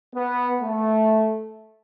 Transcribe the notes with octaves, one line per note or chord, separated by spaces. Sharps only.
B3
A3